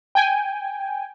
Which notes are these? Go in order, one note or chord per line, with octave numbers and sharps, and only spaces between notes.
G5 G#5